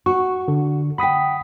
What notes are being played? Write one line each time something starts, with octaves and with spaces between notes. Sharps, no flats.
F#4 C#6
D3
F#5 G5 B5 D#6 B6